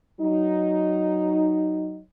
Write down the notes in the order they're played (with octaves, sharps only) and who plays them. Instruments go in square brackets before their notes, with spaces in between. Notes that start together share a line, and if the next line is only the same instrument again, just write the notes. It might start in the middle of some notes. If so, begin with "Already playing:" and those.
[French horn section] F#3 D#4